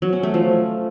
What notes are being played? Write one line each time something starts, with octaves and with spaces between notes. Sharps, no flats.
F#3
C#4
A3
F3